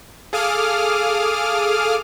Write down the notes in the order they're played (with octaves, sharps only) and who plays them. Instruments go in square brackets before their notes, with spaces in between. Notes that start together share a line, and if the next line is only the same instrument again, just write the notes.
[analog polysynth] G#4 A4 F5 D6 D#6 F6